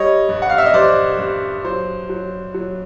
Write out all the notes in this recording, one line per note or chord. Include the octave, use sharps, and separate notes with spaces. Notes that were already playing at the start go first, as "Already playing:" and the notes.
Already playing: G3 C#5 D#5
G2
F#5
F5
E5
D#5
G2 C5 D5
G2
F#3 C5
F#3
F#3